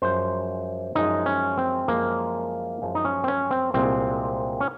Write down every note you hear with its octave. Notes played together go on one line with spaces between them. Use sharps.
F#2 F3 G#3 C5
F#2 F3 G#3 D#4
C#4
C4
F#2 F3 G#3 A#3
F#2 F3 G#3
D#4
C#4
C4
C#4
C4
C2 A#2 G#3 C4
C#4